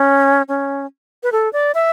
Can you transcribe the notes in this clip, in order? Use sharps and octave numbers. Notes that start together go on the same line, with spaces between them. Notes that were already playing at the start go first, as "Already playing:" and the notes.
Already playing: C#4
C#4
B4
A4
D5
E5